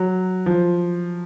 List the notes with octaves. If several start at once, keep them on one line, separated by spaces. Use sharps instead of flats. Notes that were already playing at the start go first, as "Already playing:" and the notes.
Already playing: F#3
F3